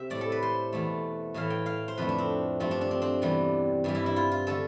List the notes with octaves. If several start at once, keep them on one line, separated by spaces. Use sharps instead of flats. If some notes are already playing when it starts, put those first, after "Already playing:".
Already playing: C3 C5 E5
A2 G3 D5
A4
B4
C5
E2 B2 A3
A2 E3 A3 F5
G5
F5
C5
F2 D3 A3 B4
D4
C4
G2 F3 A3 C4
D4
D4
C4
C4
E2 C3 G3
G2 E3 G3
E4
E4
F4
F4
D3 A3 A4